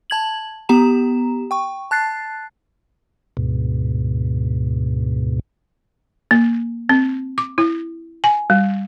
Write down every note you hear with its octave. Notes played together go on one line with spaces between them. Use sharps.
A5 G#6 F#7
B3 G4 A#5 E7
G5 C#6
A5 F#6 A6 C7
D2 G#2 B2
A#3
C4
D6
E4
G#5
G3